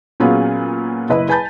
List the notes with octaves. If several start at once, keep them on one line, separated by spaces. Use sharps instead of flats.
A#2 F#3 B3 C#4 F4 G#4
F#1 E4 B4 D#5
B4 G#5 A5 B5 G6 A6